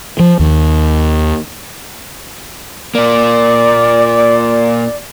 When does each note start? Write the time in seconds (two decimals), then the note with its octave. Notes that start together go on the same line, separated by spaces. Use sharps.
0.19 F3
0.40 D#2
2.95 A#2 A#3 D5